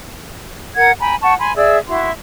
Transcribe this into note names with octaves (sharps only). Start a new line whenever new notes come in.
A#4 F#5 G#6
G5 G#5 A#5 B5
F#5 G5 A5 C#6
G#5 B5 C6
G#4 D5 E5 E6
E4 F#4 C6